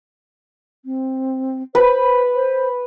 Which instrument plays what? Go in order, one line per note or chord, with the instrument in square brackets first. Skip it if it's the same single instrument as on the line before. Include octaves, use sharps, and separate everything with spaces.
[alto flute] C4
[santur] B4 [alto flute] C5
[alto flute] C5